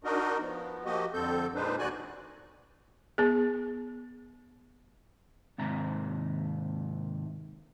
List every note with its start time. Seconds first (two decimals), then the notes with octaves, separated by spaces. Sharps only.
0.04 D4 D#4 F#4 A#4 D#5
0.40 F3 B3
0.85 F3 A#3 F#4 G4 D#5
1.14 F2 D3 C4 A4 G6
1.55 A#2 G#3 D4 D#4 B4 C5
1.79 D#2 D3 F#4 D5 G#5 F#6
3.18 B3 G#4
5.58 D#2 G#2 C3 A#5